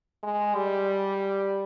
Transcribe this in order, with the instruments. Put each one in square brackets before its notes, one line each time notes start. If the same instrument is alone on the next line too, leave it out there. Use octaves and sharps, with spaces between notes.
[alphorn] G#3
G3